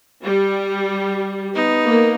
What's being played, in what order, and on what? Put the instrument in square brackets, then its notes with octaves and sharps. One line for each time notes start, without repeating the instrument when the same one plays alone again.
[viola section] G3
[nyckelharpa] B3 D#4
[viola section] A#3